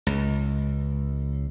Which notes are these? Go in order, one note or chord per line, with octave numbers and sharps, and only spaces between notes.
C#2